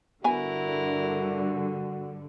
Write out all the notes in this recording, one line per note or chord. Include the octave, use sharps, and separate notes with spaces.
G2 D3 B3 E4 F#4 A#4 G#5